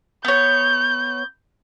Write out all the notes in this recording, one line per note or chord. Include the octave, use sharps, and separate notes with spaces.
B3 C#5 G6